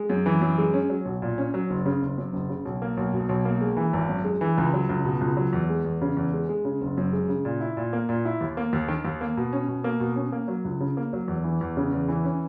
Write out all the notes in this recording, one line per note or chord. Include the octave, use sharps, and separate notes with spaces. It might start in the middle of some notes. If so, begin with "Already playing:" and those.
Already playing: G#3
F#2
E3
F#2
G#3
C#4
F#3
B1
A#2
C#4
F#3
F#1
C#3
F#1
F#2
F#1
C#3
B1
A#3
B1
B2
B1
A#3
G#3
E3
G#1
F#2
G#3
E3
C#2
F#3
C#2
B2
C#2
F#3
E2
G#3
E2
C#3
E2
G#3
G#3
C#3
F#1
F#2
G#3
C#3
A#2
E4
A#2
A#3
A#2
E4
D#2
A#3
D#2
D#3
D#2
A#3
B2
C#4
B2
A#3
B2
C#4
A#3
F#3
C#2
C#3
A#3
F#3
E2
E3
E2
C#3
E2
E3
C#4